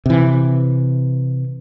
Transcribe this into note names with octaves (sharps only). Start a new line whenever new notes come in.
C3 E3